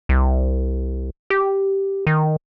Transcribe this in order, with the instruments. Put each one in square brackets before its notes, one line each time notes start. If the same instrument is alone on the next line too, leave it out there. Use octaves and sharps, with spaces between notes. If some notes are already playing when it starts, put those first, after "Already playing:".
[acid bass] C2
G4
D#3